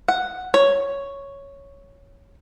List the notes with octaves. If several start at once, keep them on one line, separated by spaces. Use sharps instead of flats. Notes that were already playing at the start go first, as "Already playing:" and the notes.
F#5
C#5